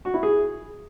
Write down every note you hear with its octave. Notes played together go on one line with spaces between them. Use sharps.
F#4
E4
G#4